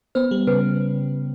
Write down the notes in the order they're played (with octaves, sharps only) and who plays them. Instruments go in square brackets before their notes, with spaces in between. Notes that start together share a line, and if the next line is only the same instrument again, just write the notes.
[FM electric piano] B3 [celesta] C5
[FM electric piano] G3
[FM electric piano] C#3 [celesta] B4